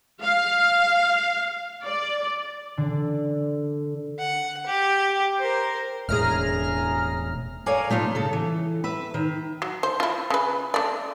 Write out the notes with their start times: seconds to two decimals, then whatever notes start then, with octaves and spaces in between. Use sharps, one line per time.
0.22 F5
1.84 D5
2.77 D3
4.19 F#5
4.67 G4
5.38 A#4 C5
6.09 E1 A2 G#4 A#5 F6
7.66 A4 A#4 C#5 D5 F5 G#5
7.90 F3 A3 D#4 F4
8.15 C#3 A4
8.33 E3
8.84 B4 E5
9.14 D#3
9.62 F#3
9.83 C5
10.00 E4 F4
10.30 C#3 B4
10.74 A3 D5